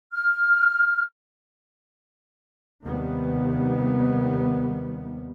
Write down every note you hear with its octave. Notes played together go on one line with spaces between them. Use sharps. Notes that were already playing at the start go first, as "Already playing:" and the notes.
F6
D#2 C3 D#3 G3 B3